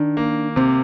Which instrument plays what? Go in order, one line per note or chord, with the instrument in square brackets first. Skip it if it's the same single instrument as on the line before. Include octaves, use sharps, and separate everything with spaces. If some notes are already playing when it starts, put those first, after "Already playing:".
Already playing: [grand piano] D#3 [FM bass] D4
[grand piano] A#3
[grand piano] C3 [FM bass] C4